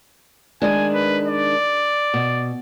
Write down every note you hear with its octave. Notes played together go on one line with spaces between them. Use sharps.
D#3 G#3 D4 G#5
B4
D5
B2